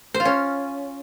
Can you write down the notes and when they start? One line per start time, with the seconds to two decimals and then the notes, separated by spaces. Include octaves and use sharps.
0.14 C5
0.20 F4
0.25 C#4